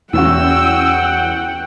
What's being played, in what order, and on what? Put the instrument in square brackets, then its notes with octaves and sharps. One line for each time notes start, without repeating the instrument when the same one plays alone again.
[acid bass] E2 [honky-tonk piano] E3 C#4 F#4 [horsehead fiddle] F#5 G5 [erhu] E6